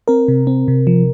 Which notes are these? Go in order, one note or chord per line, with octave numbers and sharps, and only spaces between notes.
C4 A#4
C3
C4
C3
F3